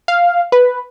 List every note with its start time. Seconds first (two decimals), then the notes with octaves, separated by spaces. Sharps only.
0.08 F5
0.52 B4